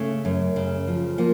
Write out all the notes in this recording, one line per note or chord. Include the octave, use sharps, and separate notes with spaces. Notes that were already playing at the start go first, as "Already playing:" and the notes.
Already playing: C#3 A3
F#2
C#3
F3
F3 A#3